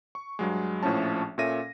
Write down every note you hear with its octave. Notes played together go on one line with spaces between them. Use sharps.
C#6
G2 F#3 G#3
A#1 A2 F3 A3 C#4 A5
A#2 C#4 A4 E5 A#6 D#7